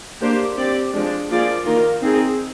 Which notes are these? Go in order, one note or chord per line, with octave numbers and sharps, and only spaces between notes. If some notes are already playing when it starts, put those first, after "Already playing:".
A#3 D4 G4 C5
C4 G4 D5
F3 G#3 D4
F3 A#3 F4 G#4 D5
D#3 A#3 F4 A#4
C4 D#4 G#4